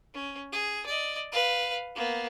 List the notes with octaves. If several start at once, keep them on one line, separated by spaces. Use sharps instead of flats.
C#4
G#4
D5 D#5
B4 F5
A#3 B3